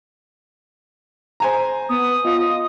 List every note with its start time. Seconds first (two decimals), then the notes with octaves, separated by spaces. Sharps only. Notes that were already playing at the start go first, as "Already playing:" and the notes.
1.40 C5 G#5 A#5
1.89 B3 D#6
2.25 F4 D#5